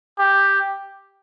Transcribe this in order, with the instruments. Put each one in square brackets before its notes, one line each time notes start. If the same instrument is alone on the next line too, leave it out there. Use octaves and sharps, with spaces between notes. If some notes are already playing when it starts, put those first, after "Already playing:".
[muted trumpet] G4